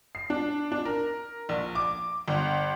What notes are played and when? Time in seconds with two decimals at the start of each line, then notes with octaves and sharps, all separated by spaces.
0.15 C7
0.30 D4
0.72 D4
0.85 A#4
1.49 A#1
1.75 D6
2.28 G1